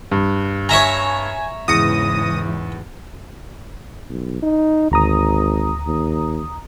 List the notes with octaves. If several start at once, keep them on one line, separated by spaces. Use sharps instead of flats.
G2
C#5 E5 G#5 A#5
E2 G#2 C#3 E3 D#6 A#6 C#7
B1
D#4
G#1 D2 A#5 D#6
D#2